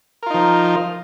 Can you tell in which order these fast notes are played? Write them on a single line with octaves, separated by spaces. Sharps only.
A#4 F4 D#4 F3